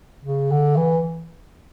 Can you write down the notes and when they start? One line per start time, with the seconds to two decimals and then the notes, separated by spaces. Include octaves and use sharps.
0.24 C#3
0.51 D3
0.76 E3